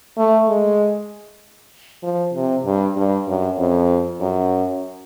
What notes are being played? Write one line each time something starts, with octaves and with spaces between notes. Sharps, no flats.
A3
G#3
F3
C3
G2
G2
F#2
F2
F#2